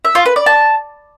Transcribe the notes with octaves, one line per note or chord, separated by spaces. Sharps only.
E5
F4
B4
D5
A5